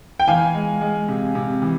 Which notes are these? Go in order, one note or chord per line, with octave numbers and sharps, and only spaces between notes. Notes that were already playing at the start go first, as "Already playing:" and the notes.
G5
E3 F5 G#5
G#3
G#3
C3
C3
E3